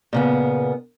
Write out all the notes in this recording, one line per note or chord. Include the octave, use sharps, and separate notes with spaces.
A#2 C#3 B3